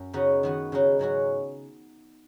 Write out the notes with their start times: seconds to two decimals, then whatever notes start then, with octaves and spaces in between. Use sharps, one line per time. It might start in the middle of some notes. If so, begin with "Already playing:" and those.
Already playing: F#2
0.13 C#3 B3 D#4 F#4
0.43 D#3 B3 F#4
0.72 C#3 G#3 D#4 F#4
0.99 G#2 F#3 C#4 F#4